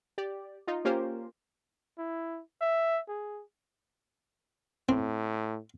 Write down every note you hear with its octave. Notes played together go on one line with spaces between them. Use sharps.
G4 D5
D#4 F4
A#3 C#4 F4 G4 A#4 C5
E4
E5
G#4
A2 C4